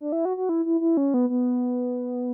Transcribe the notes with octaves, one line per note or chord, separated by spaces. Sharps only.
D4
E4
F#4
F#4
E4
E4
E4
C#4
B3
B3